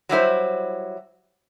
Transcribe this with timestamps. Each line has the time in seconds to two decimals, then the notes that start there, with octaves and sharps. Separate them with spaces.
0.09 F#3 G3 E4 C5